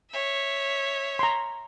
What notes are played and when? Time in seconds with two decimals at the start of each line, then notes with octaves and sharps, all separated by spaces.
0.10 C#5 E5
1.19 A#5 C6